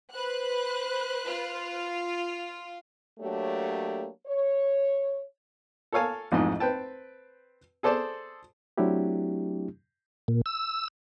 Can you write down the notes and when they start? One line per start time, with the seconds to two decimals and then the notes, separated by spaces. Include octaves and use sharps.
0.12 B4 C5 F#6
1.25 F4
3.20 F#3 A3 A#3 D4 G4 C#5
4.27 C#5
5.92 A4 A#4 C#5 F5 G#5 A5
6.32 A1 F2 G#2 D#5
6.60 C4 B4 G5 A5
7.83 G#4 A4 C5 D5 A5
8.78 F#3 A3 C4 D4 E4 G4
10.28 A#2
10.46 E6